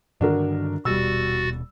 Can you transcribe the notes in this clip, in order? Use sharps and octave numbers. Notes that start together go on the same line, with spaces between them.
G2 D3 D#3 D4 F#4 A#4
D#1 B2 G3 F#4 E6 A6